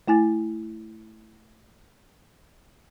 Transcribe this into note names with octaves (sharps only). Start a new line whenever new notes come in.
A3 E4 G#5 A6